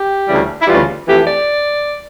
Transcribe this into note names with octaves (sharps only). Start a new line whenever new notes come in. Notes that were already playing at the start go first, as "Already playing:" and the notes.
Already playing: G4
D2 C#3 E3 G3
E4
D2 C#3 E3 G3 F4
F2 E3 A3 G4
D5